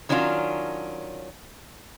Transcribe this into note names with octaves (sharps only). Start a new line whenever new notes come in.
D#3 F#3 C#4 D4 F4